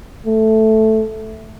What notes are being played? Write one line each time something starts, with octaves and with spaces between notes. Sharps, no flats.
A3